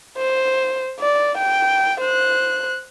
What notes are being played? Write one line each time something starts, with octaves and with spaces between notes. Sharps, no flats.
C5
D5
G5
C5 F#6